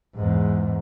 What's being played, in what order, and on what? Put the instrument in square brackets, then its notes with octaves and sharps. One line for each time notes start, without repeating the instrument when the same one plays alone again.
[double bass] E2 G#2